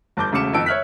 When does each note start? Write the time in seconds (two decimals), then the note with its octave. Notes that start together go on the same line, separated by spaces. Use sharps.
0.17 G1 A5 D6 G6
0.32 E1 C#3 A3 D6 C#7 E7
0.53 F2 D#3 A5 E6 D7
0.66 C#5 E5 F6 F#6 B6